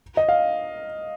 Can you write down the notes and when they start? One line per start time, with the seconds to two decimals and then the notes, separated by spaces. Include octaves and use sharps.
0.17 D#5
0.29 F5